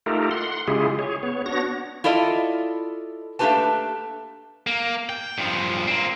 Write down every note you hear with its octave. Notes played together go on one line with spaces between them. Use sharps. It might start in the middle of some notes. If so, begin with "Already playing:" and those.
A3 D#4 F4 G4 A4 A#4
F#5 C6
C#3 G#3 E4 F4 G4 G#4
G#4 C#5
B3 C#5
B3 D4 F#4 C#5 A#6
E4 F4 A4 D5 D#5
A3 A#3 D4 G4 B4 A5
A#3
G5
G2 F3
A#3 C4